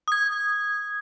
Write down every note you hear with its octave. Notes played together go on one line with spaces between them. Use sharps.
D#6 G#6